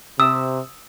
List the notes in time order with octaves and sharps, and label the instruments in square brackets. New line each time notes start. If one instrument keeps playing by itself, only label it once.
[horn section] C3 [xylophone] D#6 [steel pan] E6